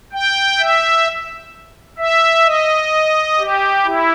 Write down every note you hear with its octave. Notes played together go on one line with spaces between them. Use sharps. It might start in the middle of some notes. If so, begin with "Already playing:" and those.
G5
E5
E5
D#5
G4
E4